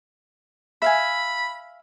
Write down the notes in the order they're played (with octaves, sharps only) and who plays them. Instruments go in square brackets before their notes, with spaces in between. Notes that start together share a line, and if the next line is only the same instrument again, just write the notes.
[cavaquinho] E5 F5 G#5 [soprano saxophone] B5